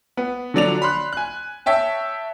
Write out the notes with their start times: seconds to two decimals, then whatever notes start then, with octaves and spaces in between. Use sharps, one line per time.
0.17 B3
0.54 D3 F3 F#3 D4 D5 F7
0.82 B5 C6 F#6
1.13 G#5 F#6
1.66 C#5 E5 G5 A5